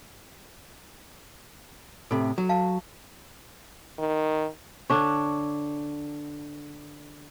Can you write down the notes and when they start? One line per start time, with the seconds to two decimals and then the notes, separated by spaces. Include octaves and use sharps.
2.11 A2 C3 A4
2.38 F#3
2.49 F5 A5
3.98 D#3
4.90 D3 D4 C#5